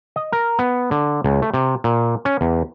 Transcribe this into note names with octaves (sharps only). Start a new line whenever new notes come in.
D#5
A#4
B3
D3
C#2
A3
C3
A#2
C#4
E2